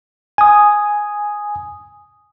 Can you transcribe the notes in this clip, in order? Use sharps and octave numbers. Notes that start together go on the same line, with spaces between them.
G#5 D#6